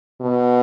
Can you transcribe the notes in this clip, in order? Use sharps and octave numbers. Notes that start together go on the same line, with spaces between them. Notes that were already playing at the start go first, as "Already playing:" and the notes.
B2